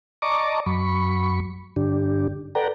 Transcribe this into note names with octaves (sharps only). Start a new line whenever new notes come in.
D5 D#5 A5 A#5 C#6 D6
F#2 F#3 B5 C#6
G2 D3 D4 G4
A4 B4 D5 F#5 G5 A#5